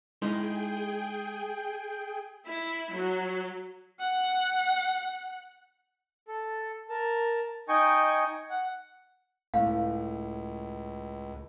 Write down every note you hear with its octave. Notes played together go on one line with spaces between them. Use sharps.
G#3 D#4 E4 G#4 G5
E4
F#3
F#5
A4
A#4 A5
D#4 D#5 G5 G#5 C#6
F#5
C#2 A2 F5